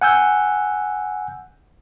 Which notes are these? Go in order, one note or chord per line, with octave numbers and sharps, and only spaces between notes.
F#5 G#5 E6 G6